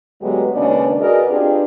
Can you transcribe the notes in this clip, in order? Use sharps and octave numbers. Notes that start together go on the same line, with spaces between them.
D2 F#3 G#3 B3 G4 B4
D#2 C#3 G#3 D4 B4 D5
F#4 G#4 A#4 B4 D5 D#5
C4 D4 F4 G4 G#4 B4